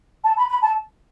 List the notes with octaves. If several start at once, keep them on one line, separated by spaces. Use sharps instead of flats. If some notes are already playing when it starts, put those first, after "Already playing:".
A5
B5
B5
A5